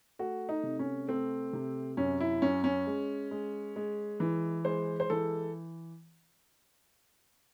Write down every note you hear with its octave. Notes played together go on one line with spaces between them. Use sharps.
A3 F#4
D#4
C3
C#4
A3 C4
C3
F#2 C#4
E4
F#2 C#4
C#4
G#3
G#3
G#3
E3
G#3 C5
C5
E3 A4